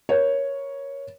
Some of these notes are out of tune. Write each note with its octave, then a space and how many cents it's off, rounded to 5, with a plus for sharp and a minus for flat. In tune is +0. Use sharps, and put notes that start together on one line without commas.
A#4 +25 C#5 +0